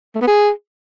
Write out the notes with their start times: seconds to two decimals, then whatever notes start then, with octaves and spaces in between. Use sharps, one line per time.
0.15 A3
0.21 B3
0.27 G#4